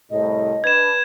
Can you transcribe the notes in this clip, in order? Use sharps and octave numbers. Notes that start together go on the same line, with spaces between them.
C2 A2 D#5
D4 B4 G#6 E7